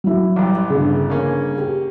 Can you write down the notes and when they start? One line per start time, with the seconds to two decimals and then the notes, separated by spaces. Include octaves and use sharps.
0.04 F#3 E4
0.36 A1 E3 G3
0.70 G1 C#3
1.10 A#3 C#4
1.58 G4